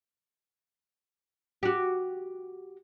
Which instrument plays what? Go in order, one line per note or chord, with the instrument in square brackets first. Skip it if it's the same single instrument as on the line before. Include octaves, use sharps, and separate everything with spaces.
[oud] F#4 G4